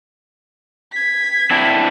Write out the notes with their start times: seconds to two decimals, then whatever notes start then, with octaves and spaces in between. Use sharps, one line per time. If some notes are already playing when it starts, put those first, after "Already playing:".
0.92 G#6 B6
1.51 C4 D4 E4